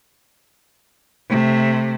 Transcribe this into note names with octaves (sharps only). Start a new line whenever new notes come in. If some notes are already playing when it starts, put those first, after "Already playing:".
C3 A3